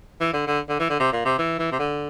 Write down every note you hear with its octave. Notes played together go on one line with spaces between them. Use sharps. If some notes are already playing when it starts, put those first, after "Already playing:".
E3
D3
D3
D3
E3
D3
C3
A#2
C3
E3
E3
C3
D3